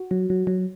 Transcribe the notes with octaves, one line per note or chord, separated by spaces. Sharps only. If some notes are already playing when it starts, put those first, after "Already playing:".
Already playing: F#4
F#3
F#3
F#3